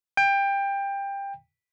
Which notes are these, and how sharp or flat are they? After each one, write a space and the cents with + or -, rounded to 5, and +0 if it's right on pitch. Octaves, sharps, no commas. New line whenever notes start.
G5 +20